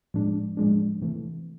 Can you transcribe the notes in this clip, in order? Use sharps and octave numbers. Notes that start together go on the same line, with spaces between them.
A2 F3 G#3 D4
A2 F3 G#3 D4
C3 E3 A3